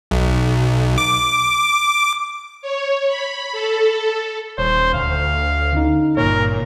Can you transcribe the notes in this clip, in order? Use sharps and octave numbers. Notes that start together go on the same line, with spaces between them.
B1
D6
C#5
B5
A4
D#1 C5 C#5
D2 F5
D3 C#4 D#4
G#1 G2 A#2 A#4 C#5